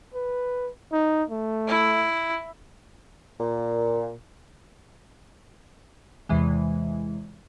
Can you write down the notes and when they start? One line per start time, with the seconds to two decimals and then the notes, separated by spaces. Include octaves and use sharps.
0.14 B4
0.92 D#4
1.30 A3
1.68 E4
3.40 A#2
6.29 E2 C3 E3 G#3